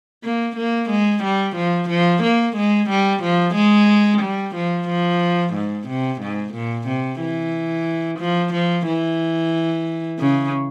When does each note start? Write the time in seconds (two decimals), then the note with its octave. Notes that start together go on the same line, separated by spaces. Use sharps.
0.24 A#3
0.57 A#3
0.90 G#3
1.24 G3
1.56 F3
1.89 F3
2.23 A#3
2.57 G#3
2.90 G3
3.23 F3
3.55 G#3
4.22 G3
4.56 F3
4.89 F3
5.54 G#2
5.88 C3
6.22 G#2
6.54 A#2
6.88 C3
7.21 E3
8.20 F3
8.53 F3
8.87 E3
10.19 C#3